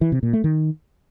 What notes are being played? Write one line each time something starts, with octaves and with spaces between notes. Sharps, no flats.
E3
C3
A#2
A3
D#3